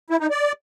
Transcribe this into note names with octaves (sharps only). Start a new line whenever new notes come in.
E4
D#4
D5